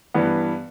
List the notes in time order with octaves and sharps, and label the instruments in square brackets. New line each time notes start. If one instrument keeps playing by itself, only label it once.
[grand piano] G2 E3 B3